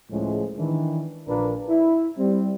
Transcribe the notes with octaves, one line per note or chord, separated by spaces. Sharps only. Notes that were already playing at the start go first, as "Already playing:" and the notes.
C#2 A2 C#3 F3 G#3
D#3 E3 D4
A#1 A#2 A#3 D4 A#4 B4
E4
G3 C4